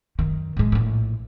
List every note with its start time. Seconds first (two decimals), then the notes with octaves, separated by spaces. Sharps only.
0.19 F#2 D#3
0.57 A2 G#3
0.72 A#1 A2